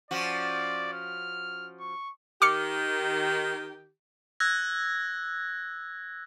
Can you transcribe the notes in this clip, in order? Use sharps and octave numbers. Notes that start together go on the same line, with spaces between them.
F3 C#4 F#4 D5
F6
C#6
D#3 G4 D6 F6 C#7
E6 F#6 G#6 A#6